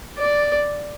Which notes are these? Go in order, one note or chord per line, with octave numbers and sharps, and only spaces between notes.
D5